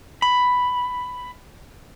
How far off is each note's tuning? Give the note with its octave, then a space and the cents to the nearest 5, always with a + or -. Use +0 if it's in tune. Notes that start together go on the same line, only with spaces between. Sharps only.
B5 +5